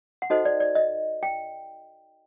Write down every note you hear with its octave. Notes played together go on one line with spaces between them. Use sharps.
F#5
D#4 F#4 A4 C5 D#5
D5
D5
D#5
G5